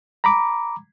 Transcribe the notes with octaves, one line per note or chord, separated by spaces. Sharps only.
A#5 B5 D6